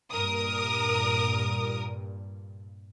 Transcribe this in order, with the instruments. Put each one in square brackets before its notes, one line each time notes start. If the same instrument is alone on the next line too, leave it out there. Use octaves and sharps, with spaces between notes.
[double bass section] G2 A#2 [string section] A#4 D#6